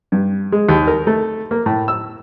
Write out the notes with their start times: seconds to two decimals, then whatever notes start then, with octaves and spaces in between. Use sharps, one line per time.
0.12 G2
0.52 G#3
0.69 D#2
0.87 A#4
1.07 A3
1.51 A#3
1.66 A2
1.88 E6